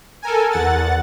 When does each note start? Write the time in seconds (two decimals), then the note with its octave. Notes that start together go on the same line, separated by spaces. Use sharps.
0.22 A4 A#4 G#5
0.51 E2 F#5 A6